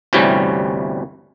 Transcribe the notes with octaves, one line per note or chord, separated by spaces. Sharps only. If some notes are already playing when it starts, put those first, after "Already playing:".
G1 D2 C3 E3 G3 C#4